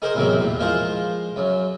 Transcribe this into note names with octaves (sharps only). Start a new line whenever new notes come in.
D#4 G#4 A#4 C5 D#5
A1 E2 C3 F#3 G#3 A#4
E2 A#2
F3 G#3 F4 A#4 C5
F#2 F#3